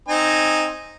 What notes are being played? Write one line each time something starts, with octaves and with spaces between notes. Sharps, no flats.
C4 D#4 G#5